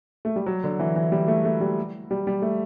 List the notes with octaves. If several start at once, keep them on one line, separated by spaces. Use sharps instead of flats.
A3
G3
F#3
D3
E3
E3
G3
A3
A3
G3
G3
G3
A3